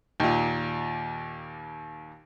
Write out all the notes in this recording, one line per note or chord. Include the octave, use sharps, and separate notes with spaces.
D#2 A#2